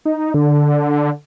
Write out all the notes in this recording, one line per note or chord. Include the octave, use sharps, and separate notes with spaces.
D#4
D3